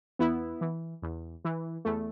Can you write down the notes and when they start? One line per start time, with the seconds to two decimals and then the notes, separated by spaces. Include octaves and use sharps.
0.19 E2 B3 E4
0.61 E3
1.02 E2
1.45 E3
1.85 E2 A3